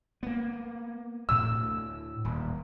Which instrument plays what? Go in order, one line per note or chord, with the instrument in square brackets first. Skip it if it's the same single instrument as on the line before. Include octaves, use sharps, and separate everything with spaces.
[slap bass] A#3 B3
[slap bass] D2 A2 [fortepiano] E6
[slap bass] D#1